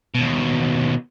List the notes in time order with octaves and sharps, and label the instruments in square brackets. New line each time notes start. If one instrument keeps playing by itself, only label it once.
[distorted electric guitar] D#2 B2